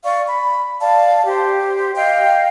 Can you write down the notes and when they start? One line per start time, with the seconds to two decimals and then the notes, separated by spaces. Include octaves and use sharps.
0.03 D5 F5 C#6
0.29 B5
0.80 D5 F5 A5
1.26 G4 C5
1.95 D#5 F5 G5